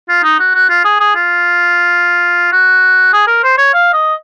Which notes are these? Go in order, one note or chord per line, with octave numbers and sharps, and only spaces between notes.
F4
D#4
F#4
F#4
F4
G#4
G#4
F4
F#4
G#4
A#4
C5
C#5
F5
D#5